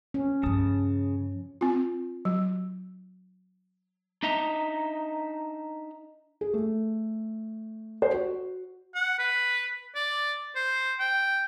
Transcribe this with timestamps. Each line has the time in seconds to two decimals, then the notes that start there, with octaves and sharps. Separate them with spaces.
0.14 C#4
0.43 G2 C#3 F3 A5 D#6
1.61 C4 F4
2.25 F#3
4.23 D4 D#4 D#5 E5 A#5
6.41 G#4
6.54 A3
8.02 C5
8.14 F#4
8.95 F#5
9.19 B4
9.95 D5
10.56 C5
11.00 G5